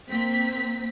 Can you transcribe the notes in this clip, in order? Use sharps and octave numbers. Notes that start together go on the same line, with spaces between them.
A#3 C4 B6